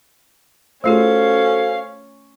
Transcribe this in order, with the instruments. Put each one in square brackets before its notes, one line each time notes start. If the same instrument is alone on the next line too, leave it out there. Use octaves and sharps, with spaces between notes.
[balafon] A3 F4 G#4 [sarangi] C#4 [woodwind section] F#4 A4 C5 [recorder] F5